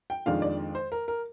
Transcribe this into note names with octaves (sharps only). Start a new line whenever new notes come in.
G5
F2 D#3 G#3 D4 F4 F5
D5
C5
A#4
A#4